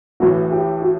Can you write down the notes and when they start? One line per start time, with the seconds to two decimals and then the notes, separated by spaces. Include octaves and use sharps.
0.20 A1 A2 E3 A3 F#4
0.51 G4
0.82 F#4